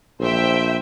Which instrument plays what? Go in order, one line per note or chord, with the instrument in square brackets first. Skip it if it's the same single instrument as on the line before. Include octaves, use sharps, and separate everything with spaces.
[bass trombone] A#1 [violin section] C5 E5 G5